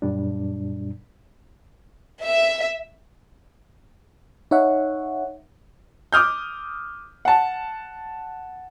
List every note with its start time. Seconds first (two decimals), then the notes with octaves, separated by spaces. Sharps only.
0.02 F#2 A#2 G3 D4
2.24 E5
4.51 D#4 C#5 E5 F#5
6.13 D6 D#6 F6 G6
7.25 F#5 A5